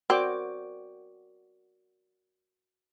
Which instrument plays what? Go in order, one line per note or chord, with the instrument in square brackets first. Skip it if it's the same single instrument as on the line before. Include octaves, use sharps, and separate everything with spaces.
[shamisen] C4 [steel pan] F#4 G5 D6 [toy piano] A#4 D5